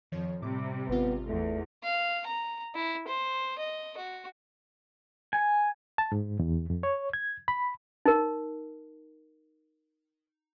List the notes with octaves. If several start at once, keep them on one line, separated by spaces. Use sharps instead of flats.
F2 D#3 F3 C#5
A2 C3 G3 D6
G#1 B3 F4
E2 A3
F5
A#5
E4
C5
D#5
F#4
G#5
A5
G#2
E2
F2
C#5
G#6
B5
D#4 A#4